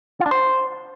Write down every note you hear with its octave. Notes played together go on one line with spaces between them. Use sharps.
F4
D4
C5